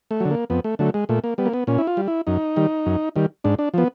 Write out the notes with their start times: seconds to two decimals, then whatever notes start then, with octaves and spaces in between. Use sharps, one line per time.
0.11 A3
0.20 D3 F#3
0.31 A#3
0.50 F2 B3
0.64 A3
0.79 D3 F#3 A3
0.94 G#3
1.09 A#2 A3
1.24 A#3
1.38 G3 B3
1.46 A#3
1.54 B3
1.67 A#2 C#4
1.78 E4
1.87 F4
1.97 G3
2.08 E4
2.27 F#2 D#4
2.56 D#3 G3
2.86 F#2
3.16 D#3 G3
3.44 G#2 D4
3.59 D4
3.74 F3 B3